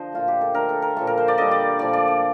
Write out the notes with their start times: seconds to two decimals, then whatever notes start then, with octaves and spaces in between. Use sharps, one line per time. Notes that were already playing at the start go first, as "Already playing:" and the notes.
Already playing: D3 F3 C5 D#5
0.13 A#2 A3 F4
0.28 G4
0.41 A4
0.54 D3 A3 A#4
0.69 A4
0.82 A#4
0.96 A#2 F3 A3 A4
1.07 A#4
1.18 C5
1.28 D5
1.38 D3 G3 D#5
1.51 D5
1.79 A#2 F3 A3 D5
1.93 D5
2.08 D5